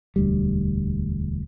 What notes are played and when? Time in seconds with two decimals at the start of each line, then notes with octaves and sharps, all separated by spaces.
0.16 E1 D2 G3